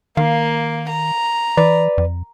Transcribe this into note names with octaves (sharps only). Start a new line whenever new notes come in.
D#3 A#3 F5
A#5
E3 B4 D5
F2